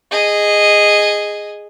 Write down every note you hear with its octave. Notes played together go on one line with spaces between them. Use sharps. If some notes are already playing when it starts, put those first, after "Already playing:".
G#4 D#5